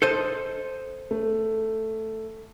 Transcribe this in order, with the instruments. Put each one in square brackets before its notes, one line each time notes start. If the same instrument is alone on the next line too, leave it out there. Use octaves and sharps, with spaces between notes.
[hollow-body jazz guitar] A4 C5 D#5
[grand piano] A3